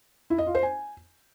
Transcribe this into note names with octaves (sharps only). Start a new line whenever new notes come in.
E4
D#5
F4
C5
G#5